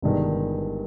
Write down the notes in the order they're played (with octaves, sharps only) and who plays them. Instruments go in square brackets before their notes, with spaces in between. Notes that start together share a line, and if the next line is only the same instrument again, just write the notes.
[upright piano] G1 G2 D#3 G#3